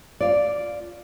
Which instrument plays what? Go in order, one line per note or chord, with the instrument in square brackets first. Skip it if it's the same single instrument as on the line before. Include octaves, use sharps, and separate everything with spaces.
[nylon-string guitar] F4 D5